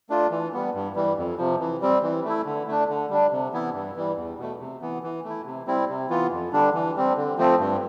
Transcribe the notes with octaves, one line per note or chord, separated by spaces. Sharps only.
A3 D4 F4
E3
G3 B3
G2
E3 G3
F2
C3 F3
E3
G3 C4
E3
A3 E4
D3
A3 D4
D3
G3 D4
C3
E3 B3 E4
G2
E3 G3
E2
B2 A3
C3
E3 B3
E3
A3
E4
C3
G3 C4 E4
C3
E3 B3 F4
F2
D3 G3 D4
E3
G3 C4
D3
F3 A3 C4
G2